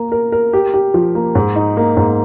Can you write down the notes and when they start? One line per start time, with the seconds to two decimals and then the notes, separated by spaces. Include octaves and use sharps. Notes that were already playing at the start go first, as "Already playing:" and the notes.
Already playing: A#3 A#4
0.12 A#4
0.32 A#4
0.53 G4
0.74 G4
0.94 F3
1.15 A#3
1.35 G#2
1.55 D#4
1.77 A#3
1.97 G#2